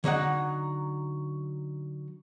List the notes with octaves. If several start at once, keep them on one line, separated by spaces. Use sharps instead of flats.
D3 F#3 D#4 F#5